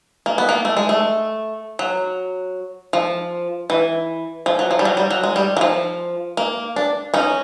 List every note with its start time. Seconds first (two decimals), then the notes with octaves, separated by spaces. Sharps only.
0.26 A#3
0.38 B3
0.49 A#3
0.65 A3
0.77 G#3
0.89 A3
1.79 F#3
2.93 F3
3.70 E3
4.46 F3
4.59 F#3
4.71 F3
4.79 G3
4.85 F#3
4.97 G3
5.11 F#3
5.24 G#3
5.36 G3
5.57 F#3
5.61 F3
6.37 A#3
6.76 D4
7.14 C#4 D#4